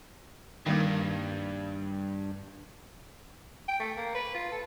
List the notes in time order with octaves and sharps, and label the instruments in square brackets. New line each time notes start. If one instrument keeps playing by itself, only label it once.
[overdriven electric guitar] G2 [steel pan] D#3 G3 A#3
[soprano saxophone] G5
A3
A#3
B4
F4
A4